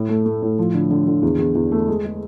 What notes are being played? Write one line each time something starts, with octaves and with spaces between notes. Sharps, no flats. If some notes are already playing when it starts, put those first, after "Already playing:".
Already playing: A2
A3
A3
A2
F3
D3
D3
D3
E2
E2
E2
A3
G#3
G#3